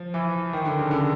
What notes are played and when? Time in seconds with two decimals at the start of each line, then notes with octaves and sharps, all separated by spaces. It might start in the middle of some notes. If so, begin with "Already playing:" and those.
Already playing: F3
0.14 E3
0.53 D#3
0.66 D3
0.79 C#3
0.91 D3